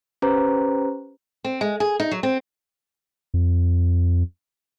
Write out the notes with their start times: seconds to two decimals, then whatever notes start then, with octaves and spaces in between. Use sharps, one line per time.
0.22 C#4 G4 B4 C5 A#5
1.44 C4
1.61 G#3
1.80 G#4
2.00 D#4
2.11 F#3
2.23 C4
3.34 F2